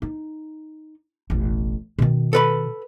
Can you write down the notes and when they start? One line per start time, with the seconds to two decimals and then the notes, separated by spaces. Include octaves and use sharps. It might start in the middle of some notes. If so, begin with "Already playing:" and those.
0.02 D#4
1.30 E1 A1
1.99 B2 D#3
2.33 A4 B4 B5